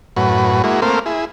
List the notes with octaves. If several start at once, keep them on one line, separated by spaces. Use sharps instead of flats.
F#2 A2 F#4 B4
G#3 A#3 E4 F#4
A3 A#3 C4 A#4 C5 F5
E4 G#4